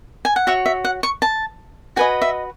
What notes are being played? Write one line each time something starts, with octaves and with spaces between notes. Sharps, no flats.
G#5
F#5
F#4 C#5 E5
E5
F#5
C#6
A5
F#4 B4 D#5 G#5
E5